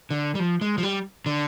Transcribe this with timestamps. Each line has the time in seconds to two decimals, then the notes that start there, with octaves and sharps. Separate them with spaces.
0.11 D3
0.35 G3
0.40 F3
0.61 G#3
0.78 F3
0.83 G3
1.26 D3